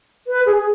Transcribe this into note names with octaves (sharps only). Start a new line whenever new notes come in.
B4
G#4
G#4